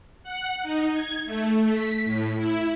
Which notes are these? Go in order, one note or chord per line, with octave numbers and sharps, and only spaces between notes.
F#5
D#4
G#6
A3
B6
A2
E4